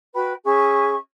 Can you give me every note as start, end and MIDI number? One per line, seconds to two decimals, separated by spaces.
0.14 0.34 66
0.14 0.34 71
0.14 0.34 79
0.14 0.34 83
0.44 0.94 61
0.44 0.94 68
0.44 0.94 76
0.44 0.94 85